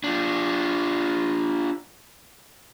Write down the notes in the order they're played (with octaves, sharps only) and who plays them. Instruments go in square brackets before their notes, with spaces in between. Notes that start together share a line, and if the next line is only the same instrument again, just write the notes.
[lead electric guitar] D4 F4